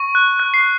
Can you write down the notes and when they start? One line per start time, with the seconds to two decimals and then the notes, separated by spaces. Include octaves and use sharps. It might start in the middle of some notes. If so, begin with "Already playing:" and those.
Already playing: C#6
0.15 F#6
0.40 F#6
0.54 C7